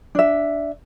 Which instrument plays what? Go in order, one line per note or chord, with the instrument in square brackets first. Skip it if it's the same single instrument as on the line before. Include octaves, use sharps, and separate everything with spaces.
[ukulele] D4 E5